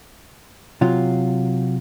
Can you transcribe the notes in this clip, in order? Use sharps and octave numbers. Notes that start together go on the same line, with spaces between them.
C3 F#3 F4